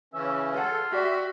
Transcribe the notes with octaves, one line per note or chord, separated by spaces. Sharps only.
C#3 E3 C#4 E5
F4 G#4 A4 F#5
F#4 G4 D5 E5 G5